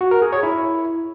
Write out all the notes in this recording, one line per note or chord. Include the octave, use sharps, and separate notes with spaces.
F#4
A#4
G#4
C#5
E4